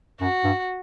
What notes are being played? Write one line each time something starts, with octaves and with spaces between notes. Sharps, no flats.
F#2 F#4
G2